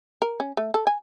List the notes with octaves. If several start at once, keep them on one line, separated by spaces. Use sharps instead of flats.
A#4
C#4
A3
A4
G#5